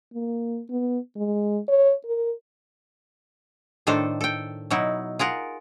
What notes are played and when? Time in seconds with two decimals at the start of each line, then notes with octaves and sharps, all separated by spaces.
0.14 A#3
0.70 B3
1.16 G#3
1.68 C#5
2.05 A#4
3.87 A2 D#3 D4 A4 C5
4.21 A4 G5
4.70 B2 F#3 D#4 E4
5.19 F4 G#4 A#4 F#5